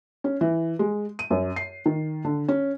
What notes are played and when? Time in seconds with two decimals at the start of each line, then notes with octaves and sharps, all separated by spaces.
0.24 C#4
0.41 E3
0.79 G#3
1.19 D#7
1.30 F#2
1.56 C7
1.86 D#3
2.24 D3
2.48 C#4